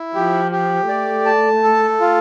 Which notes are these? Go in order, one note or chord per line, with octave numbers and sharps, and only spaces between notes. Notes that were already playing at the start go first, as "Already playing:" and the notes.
Already playing: E4
F3 G4
G4
A3 D5
A5
A4
F4